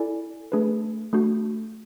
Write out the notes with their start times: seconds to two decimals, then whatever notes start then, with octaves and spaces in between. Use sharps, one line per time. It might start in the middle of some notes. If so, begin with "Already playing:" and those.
Already playing: E4 A4 D5 G#5
0.52 A3 D4 G#4 B4
1.13 A3 D4 F#4